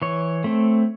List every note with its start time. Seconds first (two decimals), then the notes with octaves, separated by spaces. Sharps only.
0.02 E3 C#5
0.44 A3 C4